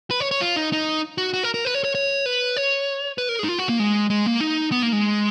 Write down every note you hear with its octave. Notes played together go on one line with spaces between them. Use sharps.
B4
C#5
C#5
F4
D#4
D#4
F#4
F#4
A#4
A#4
B4
C#5
C#5
C#5
B4
C#5
B4
A#4
G#4
D#4
F4
F#4
A#3
G#3
G#3
A#3
D#4
B3
A#3
G#3